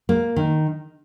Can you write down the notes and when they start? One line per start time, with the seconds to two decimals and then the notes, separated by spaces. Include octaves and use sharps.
0.09 A#3
0.36 D#3